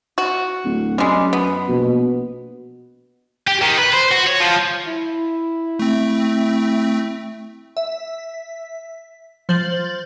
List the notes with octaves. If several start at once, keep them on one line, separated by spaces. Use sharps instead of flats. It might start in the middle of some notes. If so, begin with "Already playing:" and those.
F#4
D1
F#2 G3 G#3
B3
A#1 B2
G4
D#3
B4
C5
F#4
C#5
F3
E4
A3 C4
E5
F3 C5 G6 A6 F#7